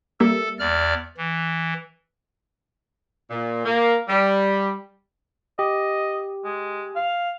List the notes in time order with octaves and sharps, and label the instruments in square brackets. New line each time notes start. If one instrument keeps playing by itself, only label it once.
[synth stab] G3 A#3 E5 [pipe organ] A4
[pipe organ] E2 D5 F6
E3
[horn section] A#2
A#3
G3
[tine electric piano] G4 [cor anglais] D#5
[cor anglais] G#3
F5